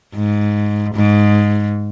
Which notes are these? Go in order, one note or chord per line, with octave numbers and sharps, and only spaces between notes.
G#2
G#2